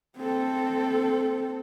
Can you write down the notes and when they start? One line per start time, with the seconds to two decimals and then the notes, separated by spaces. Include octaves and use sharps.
0.18 C4 A4